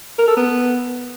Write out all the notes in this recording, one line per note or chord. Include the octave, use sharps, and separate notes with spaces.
A#4
A4
B3